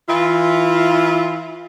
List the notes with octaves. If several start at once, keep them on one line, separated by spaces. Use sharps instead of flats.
E3 E4 F4